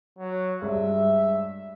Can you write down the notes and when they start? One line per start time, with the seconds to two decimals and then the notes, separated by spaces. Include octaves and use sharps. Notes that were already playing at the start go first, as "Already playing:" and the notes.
0.19 F#3
0.62 G2 G#3 E5